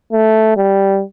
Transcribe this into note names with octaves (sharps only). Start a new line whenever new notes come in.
A3
G3